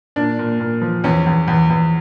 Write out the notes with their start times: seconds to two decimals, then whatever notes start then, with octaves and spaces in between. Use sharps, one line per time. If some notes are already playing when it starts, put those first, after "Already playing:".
0.16 A#2 D4
0.39 A#2
0.60 A#2
0.82 F3
1.04 E2 C#4
1.26 E2
1.48 E2
1.70 E2